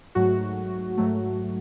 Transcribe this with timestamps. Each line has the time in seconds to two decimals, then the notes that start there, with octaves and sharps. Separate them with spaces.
0.15 G#2 F#3 A3 F#4
0.98 G#2 F#3 A3